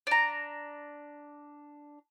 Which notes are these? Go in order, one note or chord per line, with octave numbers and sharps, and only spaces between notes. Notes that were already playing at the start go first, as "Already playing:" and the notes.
D4 A#5